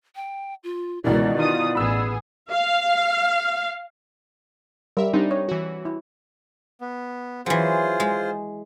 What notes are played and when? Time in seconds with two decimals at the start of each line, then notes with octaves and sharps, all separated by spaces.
0.16 G5
0.64 F4
1.04 C#2 B2 D#3 E3 D5
1.36 D#3 F4 D#6
1.75 A1 B3 G#4 B5 E6
2.50 F5
4.97 G3 A#4 E5
5.13 G3 C4 D4 D#4
5.31 C#5
5.49 E3 F#4
5.85 E4
6.81 B3
7.46 E3 F#3 F4 G#4 C5
8.00 G#3